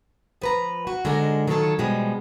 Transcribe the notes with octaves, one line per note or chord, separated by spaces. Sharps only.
F3 B4 A#5
F#4
G#2 D3 G#3 F#4 A#4
D#3 F#3 F4 G4 A4 C#5
B2 F3 G3 G#3